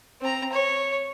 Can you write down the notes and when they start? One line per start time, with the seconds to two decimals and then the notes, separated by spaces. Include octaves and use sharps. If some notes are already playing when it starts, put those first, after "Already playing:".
0.21 C4 A#5
0.52 C#5